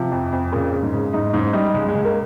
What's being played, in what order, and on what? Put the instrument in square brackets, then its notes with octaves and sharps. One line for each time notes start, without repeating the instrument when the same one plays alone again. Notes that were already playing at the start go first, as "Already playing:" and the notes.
Already playing: [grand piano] C3 [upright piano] F3
[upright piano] F2
F2
[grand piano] A#2 [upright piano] C#3
[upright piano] C#3
[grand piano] G#2
[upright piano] C#3
[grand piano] G#2 [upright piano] D#4
[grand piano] G#2 [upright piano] C#3
[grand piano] G3 [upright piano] D#4
[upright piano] C#2 [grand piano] G#3
[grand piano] G#3
[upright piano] C#2
[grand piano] A#3